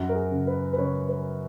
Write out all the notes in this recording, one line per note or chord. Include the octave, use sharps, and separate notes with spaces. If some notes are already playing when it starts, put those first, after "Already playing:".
Already playing: F#2 F#4
A#4
G#4
C#3
B4
B4
C#3 C#5
B4